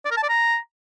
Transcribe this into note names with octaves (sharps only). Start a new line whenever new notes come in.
D5
A#4
A5
D5
A#5